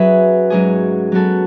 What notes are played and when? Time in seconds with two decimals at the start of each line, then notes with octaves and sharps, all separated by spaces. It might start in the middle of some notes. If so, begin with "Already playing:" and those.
Already playing: F#3 C#4 G#4 B4 E5
0.50 G#2 F#3 C#4 G#4
1.12 F#3 B3 F#4 A4